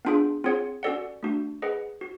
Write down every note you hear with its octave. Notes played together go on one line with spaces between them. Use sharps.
B3 D4 F4 G#4
C4 F4 G#4 C#5 F#5
C#4 F#4 A4 D5 F#5
A3 D4 F#4
G#4 B4 D#5 F#5
F#4